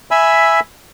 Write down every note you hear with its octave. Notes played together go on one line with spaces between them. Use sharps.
E5 G#5 B5 E6